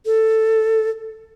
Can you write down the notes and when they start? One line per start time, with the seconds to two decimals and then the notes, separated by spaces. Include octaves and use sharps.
0.06 A4